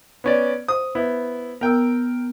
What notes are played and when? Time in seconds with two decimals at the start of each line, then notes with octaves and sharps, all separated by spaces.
0.24 B3 C#4 D5
0.68 C5 D#6
0.95 B3 E4
1.61 B3 A#4 G5 E6